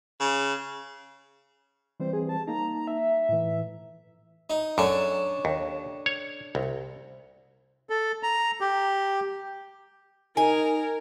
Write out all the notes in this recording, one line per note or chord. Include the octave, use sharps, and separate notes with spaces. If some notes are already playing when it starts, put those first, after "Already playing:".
C#3
E3 G3 C4 C5
G#4
A5
A#3 D#4 A#5
E5
A2 E3
D#4
F#2 C#4 D4 A4
D#2
C#5
C2
A4
A#5
G4
D#4 A#4 G#5